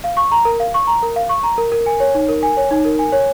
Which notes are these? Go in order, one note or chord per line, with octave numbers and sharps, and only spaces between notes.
F5
C#6
A#5
A#4
F5
C#6
A#5
A#4
F5
C#6
A#5
A#4
A#4
G#5
C#5
D#4
A#4
G#5
C#5
D#4
A#4
G#5
C#5